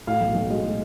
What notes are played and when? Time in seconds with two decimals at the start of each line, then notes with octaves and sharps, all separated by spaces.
0.07 A2 F5
0.21 B1
0.35 B1
0.50 G#3
0.64 A2